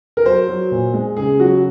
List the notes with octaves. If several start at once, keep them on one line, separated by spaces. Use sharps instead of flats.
A#4
F#3 C5
F#3
A#2
G#3
C#3 G#4
F#3 F#4